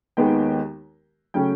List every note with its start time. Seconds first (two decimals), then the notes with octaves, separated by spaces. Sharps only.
0.17 D#2 D#3 G#3 B3 G5
1.34 C#3 F#3 A3 C#4 G5